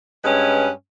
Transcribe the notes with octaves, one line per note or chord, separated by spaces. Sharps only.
G2 G#3 C#4 B4